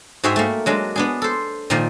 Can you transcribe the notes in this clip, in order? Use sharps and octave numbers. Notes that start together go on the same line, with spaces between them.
G#2 F#4 G#4 C#5 E5 G5
A3 A#3
F#3 G#3 D4
B3 D4 G#4
A4 C5
A#2 D#3 F3 A#3